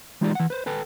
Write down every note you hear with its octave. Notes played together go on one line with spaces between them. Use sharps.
E3 G#3 D#4 F4 G4 D5
E3 F#5
B4 C5
A4 B4 G5 A5